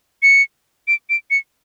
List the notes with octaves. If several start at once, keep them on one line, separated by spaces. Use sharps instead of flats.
C#7
D7
D7
C#7